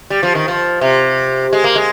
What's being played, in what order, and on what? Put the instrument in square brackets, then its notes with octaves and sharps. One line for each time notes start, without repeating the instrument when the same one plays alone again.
[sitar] G3
F3
D#3
F3
C3
G#3
A#3
G#3